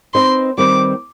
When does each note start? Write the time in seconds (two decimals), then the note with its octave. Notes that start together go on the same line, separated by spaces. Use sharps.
0.14 C4 D#4 B4 D#5 C6
0.58 D#3 G3 C4 G4 B4 D6